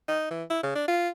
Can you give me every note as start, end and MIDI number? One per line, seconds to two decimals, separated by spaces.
0.08 0.28 63
0.31 0.44 52
0.50 0.58 64
0.63 0.72 49
0.76 0.84 62
0.88 1.09 65